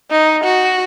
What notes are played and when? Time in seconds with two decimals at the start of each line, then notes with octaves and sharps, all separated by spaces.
0.11 D#4
0.43 F#4